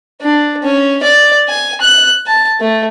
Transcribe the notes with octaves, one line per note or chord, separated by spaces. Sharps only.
D4
C#4
D5
G#5
F#6
A5
A3